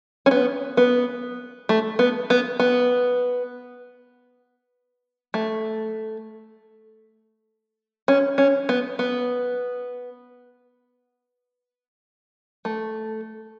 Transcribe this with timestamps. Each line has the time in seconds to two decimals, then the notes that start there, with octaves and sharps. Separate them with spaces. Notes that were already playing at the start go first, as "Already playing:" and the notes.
0.26 C#4
0.31 B3
0.77 B3
1.69 A3
1.99 B3
2.30 B3
2.60 B3
5.34 A3
8.08 C#4
8.38 C#4
8.69 B3
8.99 B3
12.65 A3